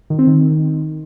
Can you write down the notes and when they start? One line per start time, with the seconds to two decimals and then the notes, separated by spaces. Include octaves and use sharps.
0.10 D#3
0.19 C4
0.27 D#3